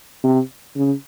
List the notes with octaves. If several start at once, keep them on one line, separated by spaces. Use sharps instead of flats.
C3
C#3